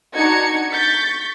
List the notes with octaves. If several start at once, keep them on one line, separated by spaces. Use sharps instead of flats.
D4 D#4 F#4 G#6 C#7
C#6 G6 A6 B6